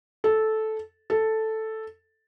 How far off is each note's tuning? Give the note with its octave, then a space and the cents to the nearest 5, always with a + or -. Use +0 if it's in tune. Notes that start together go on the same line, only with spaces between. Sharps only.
A4 -10
A4 +0